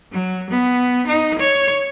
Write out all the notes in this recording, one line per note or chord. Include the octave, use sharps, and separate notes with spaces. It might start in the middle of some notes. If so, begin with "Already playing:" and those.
F#3
B3
D#4
C#5